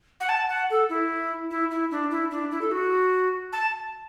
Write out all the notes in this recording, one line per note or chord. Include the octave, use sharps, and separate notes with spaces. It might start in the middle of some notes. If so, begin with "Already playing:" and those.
F#5
A5
F#5
A4
E4
E4
E4
D4
E4
D4
E4
A4
F#4
A5